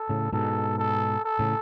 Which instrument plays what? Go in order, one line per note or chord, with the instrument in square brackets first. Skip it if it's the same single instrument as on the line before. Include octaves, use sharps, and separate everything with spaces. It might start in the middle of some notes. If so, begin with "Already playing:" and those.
Already playing: [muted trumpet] A4
[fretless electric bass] A2 C#3
[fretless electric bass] G#2 B2 [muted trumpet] A4
[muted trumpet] A4
A4
[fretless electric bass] A2 C#3